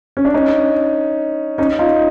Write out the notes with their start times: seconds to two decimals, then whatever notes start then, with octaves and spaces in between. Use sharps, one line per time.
0.17 C#4
0.25 D4
0.34 C#4 D#4
1.58 C#4 D#4
1.79 D#4 F4